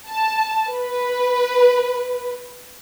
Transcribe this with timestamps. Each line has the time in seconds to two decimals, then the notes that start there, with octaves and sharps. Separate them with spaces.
0.10 A5
0.71 B4